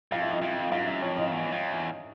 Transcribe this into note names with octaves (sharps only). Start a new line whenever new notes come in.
F2 F5
E5
D#5
F2 E5
F#2 F5
E5
F2 C#5
D#5
E2
F2
E2